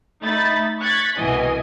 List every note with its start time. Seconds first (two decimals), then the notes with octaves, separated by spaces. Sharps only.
0.23 A3 D#4 E5 B5 A6
0.80 C#6 F#6 G#6 A6 B6
1.15 C2 B2 E3 D#5 G#5